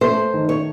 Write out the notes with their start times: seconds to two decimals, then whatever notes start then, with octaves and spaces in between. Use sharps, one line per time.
0.01 A3 C5
0.33 D#3
0.49 C#5